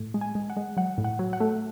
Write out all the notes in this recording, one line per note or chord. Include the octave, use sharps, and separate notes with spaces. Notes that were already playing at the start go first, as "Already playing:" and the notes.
Already playing: A2
G#3
G#5
G#3
F#5
G#3
F#3 F#5
A2
F#5
F#3
F#5
A3